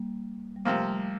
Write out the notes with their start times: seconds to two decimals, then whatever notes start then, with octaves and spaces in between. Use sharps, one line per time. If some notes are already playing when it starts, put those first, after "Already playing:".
Already playing: G3 A#3
0.56 G3
0.65 C3 F3 A3 A#3
0.85 G3